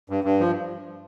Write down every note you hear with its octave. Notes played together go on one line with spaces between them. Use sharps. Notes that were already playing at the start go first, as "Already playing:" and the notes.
G2
G2
F3